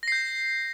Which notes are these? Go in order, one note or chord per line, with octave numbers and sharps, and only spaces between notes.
G6 A#6 C7